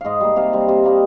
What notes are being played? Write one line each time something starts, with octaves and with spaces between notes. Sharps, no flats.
G#2 D#5 F5
G3 A#3
C3 F5
G3 C4
C3
G3 A#3 D#4